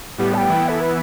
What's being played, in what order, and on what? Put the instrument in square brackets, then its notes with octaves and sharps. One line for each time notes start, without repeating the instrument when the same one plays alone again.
[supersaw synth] A2 G3 B3 [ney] G4
[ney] A5
G5
[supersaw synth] E3 B3 E4
[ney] A4
B4